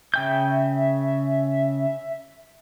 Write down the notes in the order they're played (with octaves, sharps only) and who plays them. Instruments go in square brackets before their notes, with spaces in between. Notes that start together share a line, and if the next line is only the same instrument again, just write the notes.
[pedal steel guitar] C#3 G5 G6 [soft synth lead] E5